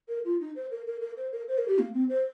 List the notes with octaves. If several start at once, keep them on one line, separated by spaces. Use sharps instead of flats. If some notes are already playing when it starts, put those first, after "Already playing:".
A#4
F4
D#4
C5
A#4
A#4
A#4
C5
A#4
C5
A#4
G4
A#3
C4
C5